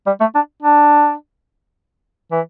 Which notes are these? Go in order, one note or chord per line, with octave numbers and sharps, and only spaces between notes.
G3
A3
D4
D4
E3